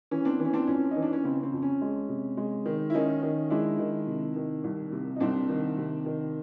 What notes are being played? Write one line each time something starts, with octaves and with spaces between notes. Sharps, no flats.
E3 C#4
C4 D4
E3
C#4
C4 D4
F2 C#4
D#4
E3
D4
C#4
C#3 C4
C4
F2
C#4
G#3
C3
G#3
D#3
E4
D#3 C#4 D#4
D#3
G#3 D4 E4
D#3
C3
D#3
C2
C3
D#4
C2 C4 D4
D#3
C3
D#3